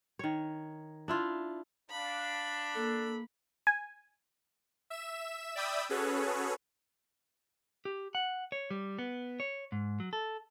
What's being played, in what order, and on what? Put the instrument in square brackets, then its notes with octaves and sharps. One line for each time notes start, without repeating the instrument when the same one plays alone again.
[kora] D#3 C#5
D4 E4 F4
[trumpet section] D4 [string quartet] F5 [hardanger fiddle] B5
[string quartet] A#3 [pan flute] A4
[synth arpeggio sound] G#5
[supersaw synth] E5 E7
D5 E5 G5 B5 D#6 E6
C#4 F#4 G#4 A4 B4 C#5
[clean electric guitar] G4
F#5
C#5
G3
B3
C#5
G#2
F#3
A4